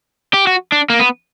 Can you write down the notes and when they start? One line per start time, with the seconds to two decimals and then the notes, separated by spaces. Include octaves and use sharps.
0.34 G4
0.47 F#4
0.72 D4
0.90 A#3
0.99 B3